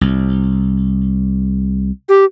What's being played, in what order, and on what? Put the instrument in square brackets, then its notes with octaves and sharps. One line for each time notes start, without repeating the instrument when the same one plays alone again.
[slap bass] C2
[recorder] G4